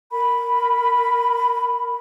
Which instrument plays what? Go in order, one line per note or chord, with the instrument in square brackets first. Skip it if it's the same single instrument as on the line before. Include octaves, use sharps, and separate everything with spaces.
[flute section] A#4 B5